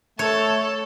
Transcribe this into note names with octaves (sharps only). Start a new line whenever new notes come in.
A3 A4 C#5